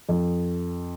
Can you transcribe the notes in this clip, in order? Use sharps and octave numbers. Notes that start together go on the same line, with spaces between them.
F2